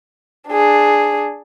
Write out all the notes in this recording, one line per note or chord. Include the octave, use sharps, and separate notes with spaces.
D4 G#4